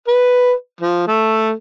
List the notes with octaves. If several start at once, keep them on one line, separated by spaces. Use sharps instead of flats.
B4
F3
A3